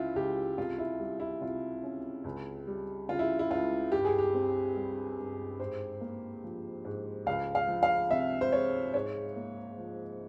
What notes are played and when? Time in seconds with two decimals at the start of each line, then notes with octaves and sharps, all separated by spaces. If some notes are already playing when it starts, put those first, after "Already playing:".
Already playing: C#2 C#3 E4 F4
0.15 C#2 G4
0.58 C2 F4
0.79 E4
1.00 G3
1.20 E4
1.41 C3 F4
1.83 C#4
2.24 C#2
2.67 G3
3.08 C#3 F4
3.19 E4
3.39 E4
3.50 C#2 F4
3.92 G2 G4
4.05 G#4
4.18 G4
4.34 C4
4.76 G3
5.18 G2
5.60 G#2 C5
6.01 A#3
6.44 F3
6.85 G#2
7.26 C#2 F5
7.55 F5
7.68 F3
7.83 F5
8.11 C3 E5
8.41 C5
8.52 G#3 C#5
8.94 G#2 C#5
9.36 A#3
9.78 F3